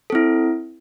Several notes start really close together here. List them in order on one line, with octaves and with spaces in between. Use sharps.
A4 C4 E4